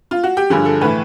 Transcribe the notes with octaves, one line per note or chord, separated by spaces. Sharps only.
F4
F#4
G4
G2 D3 F3 G#4
A4
A2 E3 B4